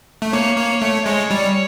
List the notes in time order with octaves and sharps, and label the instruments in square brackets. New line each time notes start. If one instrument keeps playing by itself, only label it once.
[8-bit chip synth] A3
[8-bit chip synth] A#3 [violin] C#5
[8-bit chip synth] A#3
A3
[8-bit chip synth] G#3 [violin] C#5
[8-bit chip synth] G3